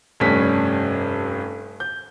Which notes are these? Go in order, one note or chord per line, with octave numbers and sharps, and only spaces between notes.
F1 G2 C#4 B6
G6